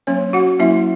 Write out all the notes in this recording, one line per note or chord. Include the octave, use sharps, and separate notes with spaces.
F#3 A#3 C#4 C#5
F#4 F#5
F#3 A#3 C#4 E4 E5